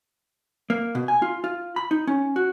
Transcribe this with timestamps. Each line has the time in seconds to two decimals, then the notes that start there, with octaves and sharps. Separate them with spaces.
0.70 A#3
0.95 B2
1.08 G#5
1.22 F4
1.44 F4
1.76 B5
1.91 D#4
2.07 C#4
2.36 F#4